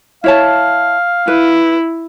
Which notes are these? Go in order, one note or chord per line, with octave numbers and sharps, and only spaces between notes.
E4 C#5 F5 A5
E4 B4